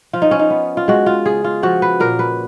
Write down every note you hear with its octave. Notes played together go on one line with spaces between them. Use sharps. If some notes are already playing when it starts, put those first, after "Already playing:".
F3 F4
D#4
C#4
D#4
B3
F4
G#3 F#4
F4
C#3 G#4
F4
F3 F#4
B4
A#2 A#4
B4